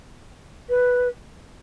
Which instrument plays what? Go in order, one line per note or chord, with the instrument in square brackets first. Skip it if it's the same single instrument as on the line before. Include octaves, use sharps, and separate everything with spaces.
[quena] B4